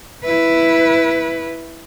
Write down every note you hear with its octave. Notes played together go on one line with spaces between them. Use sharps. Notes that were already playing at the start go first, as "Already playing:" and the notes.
E4 B4